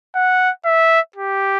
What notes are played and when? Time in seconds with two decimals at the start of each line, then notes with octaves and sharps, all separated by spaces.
0.15 F#5
0.65 E5
1.16 G4